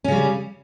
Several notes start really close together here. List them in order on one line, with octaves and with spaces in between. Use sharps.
C#4 C#3 G3